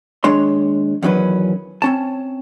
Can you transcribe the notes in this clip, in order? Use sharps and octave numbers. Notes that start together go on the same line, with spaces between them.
D#2 G#3 D4 C#5 C6
E2 D#3 F#3 C#4 B4
C4 C#4 A5